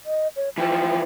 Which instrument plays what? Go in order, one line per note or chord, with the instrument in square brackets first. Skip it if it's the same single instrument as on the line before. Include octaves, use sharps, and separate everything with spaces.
[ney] D#5
C#5
[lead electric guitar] E3 F3 [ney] G5